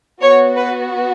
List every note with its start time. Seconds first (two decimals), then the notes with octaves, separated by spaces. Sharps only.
0.21 B3 F#4 C#5
0.56 B4